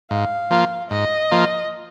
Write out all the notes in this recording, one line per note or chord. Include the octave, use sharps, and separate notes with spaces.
G#2 F5
F3 A#3 F4
G#2 D#5
F3 A#3 F4